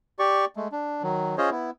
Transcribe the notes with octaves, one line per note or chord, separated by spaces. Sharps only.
G4 D5 C#6
G#3 A3
D4
D#3 F#3
C#4 F4 G#4 C5 C#5 D#5
B3 E4